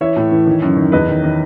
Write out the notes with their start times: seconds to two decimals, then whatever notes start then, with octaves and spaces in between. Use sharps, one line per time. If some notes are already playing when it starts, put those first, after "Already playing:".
0.01 E3 C#5 E5
0.16 A2
0.32 E3
0.47 D#3
0.62 F#2
0.77 D#3
0.92 E2 B4 D#5
1.08 D#3
1.24 D#3